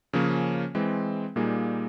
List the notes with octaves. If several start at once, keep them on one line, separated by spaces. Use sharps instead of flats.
C#3 F3 A#3 C#4
E3 G#3 C4
A#2 G3 A#3 D#4 G#4